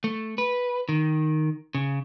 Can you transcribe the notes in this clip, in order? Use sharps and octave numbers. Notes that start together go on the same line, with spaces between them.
A3
B4
D#3
C#3